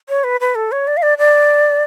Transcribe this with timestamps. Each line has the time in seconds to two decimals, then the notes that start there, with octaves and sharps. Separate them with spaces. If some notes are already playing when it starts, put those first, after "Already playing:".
0.09 C#5
0.24 B4
0.41 B4
0.55 A4
0.72 C#5
0.87 D5
0.97 F5
1.02 D5
1.18 D5